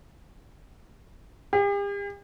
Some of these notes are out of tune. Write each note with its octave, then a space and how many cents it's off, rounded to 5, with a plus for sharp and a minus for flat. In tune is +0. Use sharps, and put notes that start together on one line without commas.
G4 +45